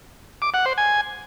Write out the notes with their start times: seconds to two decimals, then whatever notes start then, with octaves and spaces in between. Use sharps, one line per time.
0.42 D6
0.54 F#5
0.66 C5
0.78 G#5